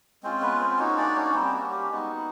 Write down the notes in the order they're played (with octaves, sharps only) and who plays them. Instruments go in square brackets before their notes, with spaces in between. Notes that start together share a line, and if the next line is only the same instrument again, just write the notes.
[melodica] G#3 C4 C#4 F4 C5
B3 B4
C4 C5
C5
A#3 C#4 D#4 F#4 C#5
D4 D5
C#4 C#5
G3 A#3 C4 C#4 C5
F#4
G4
G#3 B3 D#4 F#4